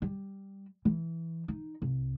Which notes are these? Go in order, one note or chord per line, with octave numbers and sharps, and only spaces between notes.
G3
E3
D#4
C2